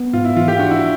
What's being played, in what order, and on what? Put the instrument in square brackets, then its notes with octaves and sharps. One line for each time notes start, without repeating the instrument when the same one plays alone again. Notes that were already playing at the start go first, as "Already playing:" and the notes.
Already playing: [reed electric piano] B3
[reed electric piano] G#2 [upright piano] F4
[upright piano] E4
[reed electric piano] E3 [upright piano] F4
[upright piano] G4
[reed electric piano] D4 [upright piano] F#4
[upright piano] E4